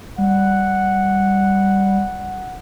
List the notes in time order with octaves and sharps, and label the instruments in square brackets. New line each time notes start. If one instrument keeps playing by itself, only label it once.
[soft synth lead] G3 [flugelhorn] F#5